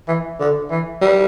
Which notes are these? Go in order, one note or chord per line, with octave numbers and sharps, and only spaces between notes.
E3
D3
E3
G3